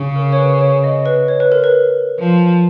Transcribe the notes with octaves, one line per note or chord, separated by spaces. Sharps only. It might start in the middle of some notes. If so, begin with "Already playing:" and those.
Already playing: C#3
A#4
C#5
B4
C#5
D#5
B4
C#5
B4
A#4
B4
F3